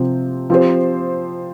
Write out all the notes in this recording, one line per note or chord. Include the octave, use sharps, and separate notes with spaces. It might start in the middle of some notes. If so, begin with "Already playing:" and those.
Already playing: C3 F3 C4
F3 C4 G4 C5